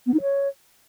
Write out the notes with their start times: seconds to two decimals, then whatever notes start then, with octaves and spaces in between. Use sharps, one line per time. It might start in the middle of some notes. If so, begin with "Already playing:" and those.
0.06 B3
0.14 D#4
0.21 C#5